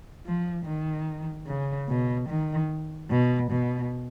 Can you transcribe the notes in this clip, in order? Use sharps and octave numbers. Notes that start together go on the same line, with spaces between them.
F3
D#3
C#3
B2
D#3
B2
B2